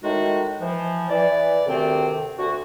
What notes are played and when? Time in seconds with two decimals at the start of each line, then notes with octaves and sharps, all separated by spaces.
0.04 A2 D#3 G#3 D#4 F#4
0.62 E3 F3
1.10 E3 D5
1.66 D2 A2 C3 D#3 C4
2.39 D2 D3 F#4